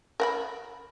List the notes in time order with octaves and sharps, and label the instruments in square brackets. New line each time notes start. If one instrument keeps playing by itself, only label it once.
[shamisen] A#4 F#5 B5